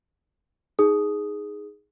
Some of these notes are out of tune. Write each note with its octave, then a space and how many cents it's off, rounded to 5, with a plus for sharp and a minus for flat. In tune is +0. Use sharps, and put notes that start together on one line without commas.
D#4 +0 G#4 +0 D#6 +0